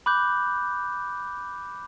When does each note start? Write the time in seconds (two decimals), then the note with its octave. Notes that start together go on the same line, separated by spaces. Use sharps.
0.06 B5 D6 F#6 G6